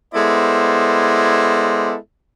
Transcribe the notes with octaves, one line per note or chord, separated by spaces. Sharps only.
G#3 B3 E4 A4 C5 D5